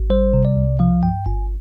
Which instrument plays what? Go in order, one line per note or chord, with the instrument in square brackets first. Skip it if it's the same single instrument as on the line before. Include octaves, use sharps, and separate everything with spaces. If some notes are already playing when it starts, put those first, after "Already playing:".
Already playing: [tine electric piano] G#1
G3 C5
C3
D5
C2
F3 F5
G2 G5
G1 G#5